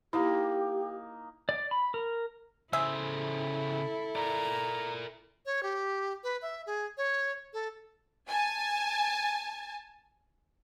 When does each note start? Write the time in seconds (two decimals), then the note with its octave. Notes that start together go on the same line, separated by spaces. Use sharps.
0.13 A#3 D#4 E4 G4
1.49 D5
1.71 B5
1.94 A#4
2.73 C#3 E4 G#4 A4 C5 E5
4.16 A#4 D5 A#5
5.46 C#5
5.63 G4
6.24 B4
6.42 E5
6.66 G#4
6.97 C#5
7.53 A4
8.28 G#5 A5